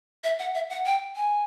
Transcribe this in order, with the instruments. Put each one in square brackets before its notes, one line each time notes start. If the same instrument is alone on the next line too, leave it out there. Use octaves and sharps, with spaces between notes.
[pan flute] E5
F#5
E5
F#5
G5
G#5